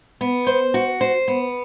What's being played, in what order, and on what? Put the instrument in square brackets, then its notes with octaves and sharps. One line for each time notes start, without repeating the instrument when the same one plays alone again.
[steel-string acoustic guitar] B3
C5
F#4
C5
B3